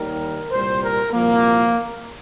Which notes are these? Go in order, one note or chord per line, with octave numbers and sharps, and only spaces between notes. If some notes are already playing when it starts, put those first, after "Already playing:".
Already playing: D#2 D#3 G3 A#4
C2 A#2 G3 C5
A#4
C2 A#2 F3 A#3